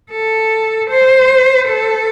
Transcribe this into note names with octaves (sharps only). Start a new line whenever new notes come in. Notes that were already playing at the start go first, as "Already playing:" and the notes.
A4
C5
A4